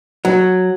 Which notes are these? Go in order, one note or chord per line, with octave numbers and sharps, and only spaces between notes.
F#3